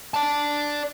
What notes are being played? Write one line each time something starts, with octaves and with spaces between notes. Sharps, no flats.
D5 A5